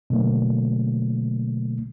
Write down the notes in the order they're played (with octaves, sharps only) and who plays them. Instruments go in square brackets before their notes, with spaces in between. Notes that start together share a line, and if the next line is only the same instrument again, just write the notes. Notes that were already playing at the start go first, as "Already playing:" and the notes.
[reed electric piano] B2 D3 F#3 A3 A#3